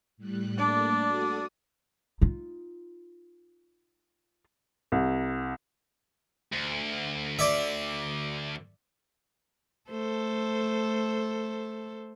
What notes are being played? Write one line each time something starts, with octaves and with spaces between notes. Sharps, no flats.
A2 G3 F#6
A3 A#3 D4 D5
F#4 A4 D#6
D#4 F4
C2
D2
D5 E5
A3 A4 C5